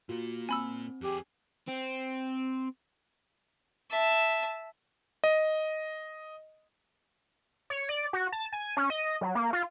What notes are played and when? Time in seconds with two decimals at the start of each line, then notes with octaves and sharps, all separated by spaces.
0.09 A#2 A#3 F4 F#4
0.49 C4 G#5 B5 E6
1.01 F2 G4 G#4
1.68 C4
3.90 E5 A5
5.24 D#5
7.70 C#5
7.89 D5
8.13 F#4
8.32 A5
8.53 G#5
8.77 C#4
8.90 D#5
9.21 F#3
9.35 A#3
9.53 F4